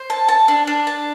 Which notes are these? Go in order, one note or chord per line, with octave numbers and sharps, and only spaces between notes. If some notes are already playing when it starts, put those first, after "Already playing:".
Already playing: C5
A5
A5
D4
D4
A5